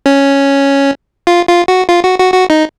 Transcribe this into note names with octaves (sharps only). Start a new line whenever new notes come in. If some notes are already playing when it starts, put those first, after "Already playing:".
C#4
F4
F4
F#4
F4
F#4
F#4
F#4
D#4